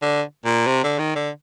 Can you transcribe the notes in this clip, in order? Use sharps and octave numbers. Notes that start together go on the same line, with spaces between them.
D3
A#2
C3
D3
D#3
D3